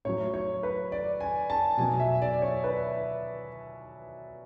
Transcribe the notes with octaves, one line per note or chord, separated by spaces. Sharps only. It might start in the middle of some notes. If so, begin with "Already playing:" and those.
A2 F#3 C#5
C#5
B4
D5
G#5
A5
B2 F#3 G#5
E5
D5
C#5
B4